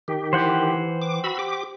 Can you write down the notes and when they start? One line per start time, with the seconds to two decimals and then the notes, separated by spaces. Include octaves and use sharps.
0.08 D#3 G4
0.33 E3 C5 F#5 G5
1.02 D6
1.24 F#4 B5 E6
1.39 G4 D6